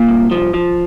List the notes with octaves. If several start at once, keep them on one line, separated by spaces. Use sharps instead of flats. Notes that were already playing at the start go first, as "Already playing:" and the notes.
Already playing: A#2
C2
F3
F3